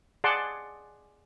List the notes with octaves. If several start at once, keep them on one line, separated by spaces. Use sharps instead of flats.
G#4 D5 F#5 A5 C6 D6